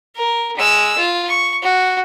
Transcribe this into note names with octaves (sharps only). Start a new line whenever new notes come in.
A#4
G#3 E6
F4
C#6
F#4